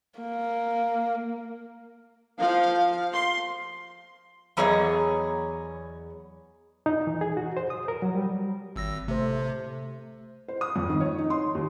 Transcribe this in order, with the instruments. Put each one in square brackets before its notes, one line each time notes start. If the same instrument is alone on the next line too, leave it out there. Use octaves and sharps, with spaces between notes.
[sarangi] A#3
[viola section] F3 [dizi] F5
[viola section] C6
[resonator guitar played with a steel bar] E2 F#3 B3 G#4 C#5 D#5
[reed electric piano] D#4
E3
G#4
F#4
C5
D#6
A#4
F#3
G3
[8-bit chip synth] G#1 E6 A#6
[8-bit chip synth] C3 [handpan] A3 C5
[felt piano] C5
D#6
F2
D#3
C#5
D#4
C6
D#2